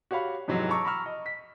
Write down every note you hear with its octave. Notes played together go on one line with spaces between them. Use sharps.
F#4 G4 C#5 F5 B5
F2 G#2 C3 E3 F#3 C4
A5 A#5 C#6 D6 E6
A#5 B5 C#6 E6 F6
D#5
B6